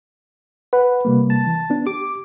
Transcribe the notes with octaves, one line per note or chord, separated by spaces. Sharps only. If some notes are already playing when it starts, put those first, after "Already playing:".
B4 F#5
C3 G3 A#3
A5
E3
B3 D4
G4 D6